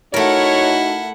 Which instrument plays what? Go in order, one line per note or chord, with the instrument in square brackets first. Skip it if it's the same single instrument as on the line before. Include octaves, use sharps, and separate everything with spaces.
[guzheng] A3 A#4 [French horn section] D#4 F#4 [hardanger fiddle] E4 F#5 [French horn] C#5